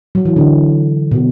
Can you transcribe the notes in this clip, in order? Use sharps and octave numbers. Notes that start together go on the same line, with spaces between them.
F#3
E3
D3
B2